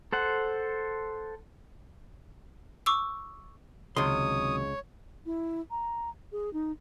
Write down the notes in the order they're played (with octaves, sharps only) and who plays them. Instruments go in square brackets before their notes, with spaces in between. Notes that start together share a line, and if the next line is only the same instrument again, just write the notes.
[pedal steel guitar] A4 C5 F#5
[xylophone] C#6 D6 E6
[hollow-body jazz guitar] C#2 C6 [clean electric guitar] C3 D#3 F#3 [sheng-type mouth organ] C#5 [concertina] D#6
[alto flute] E4
A#5
G#4
D#4